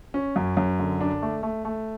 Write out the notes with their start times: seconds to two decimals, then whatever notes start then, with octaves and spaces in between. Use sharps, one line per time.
0.14 C#4
0.36 F#2
0.57 F#2
0.79 D3
1.01 D4
1.22 A3
1.43 A3
1.65 A3